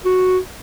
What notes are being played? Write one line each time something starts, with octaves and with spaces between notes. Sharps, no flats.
F#4